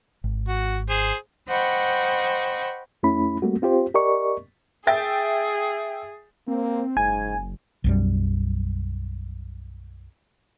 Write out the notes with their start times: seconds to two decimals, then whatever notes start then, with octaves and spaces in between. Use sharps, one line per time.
0.24 G#1
0.48 F#4
0.89 G#4 C5
1.47 C5 D#5 F#5 G5 B5 C#6
3.03 F2 A3 C#4 E4 B5
3.42 G3 A3 A#3 C4 F#4
3.62 C4 F4 G4 C5
3.94 G4 A#4 D5 D#5 C#6
4.87 G#4 E5 G5 A6
6.48 A#3 C4
6.97 F#1 G#2 G#5
7.84 B1 F#2 G3